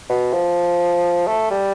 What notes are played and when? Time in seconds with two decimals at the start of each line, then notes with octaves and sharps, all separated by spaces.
0.09 B2
0.33 F3
1.27 A3
1.51 G3